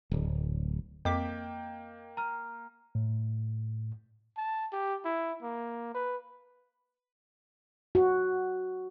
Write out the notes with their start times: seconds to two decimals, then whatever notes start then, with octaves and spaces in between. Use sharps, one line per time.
0.11 D1
1.05 F2 A#3 D#5 G5 D6 B6
2.17 A#5 F6
2.95 A2
4.37 A5
4.73 G4
5.05 E4
5.43 A#3
5.95 B4
7.95 F#4